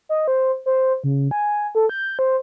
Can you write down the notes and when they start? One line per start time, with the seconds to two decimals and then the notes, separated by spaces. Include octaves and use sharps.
0.09 D#5
0.28 C5
0.66 C5
1.04 C#3
1.31 G#5
1.75 A4
1.89 G6
2.19 C5